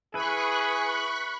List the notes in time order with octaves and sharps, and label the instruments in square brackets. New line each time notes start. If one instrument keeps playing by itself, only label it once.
[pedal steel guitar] E4 B4 [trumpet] G#4 [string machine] B5 C#6 F#6